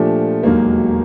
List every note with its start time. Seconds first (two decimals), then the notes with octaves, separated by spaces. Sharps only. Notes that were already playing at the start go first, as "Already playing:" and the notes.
Already playing: A#2 F3 A3 D4 G4
0.43 E1 D#2 D#3 F#3 A#3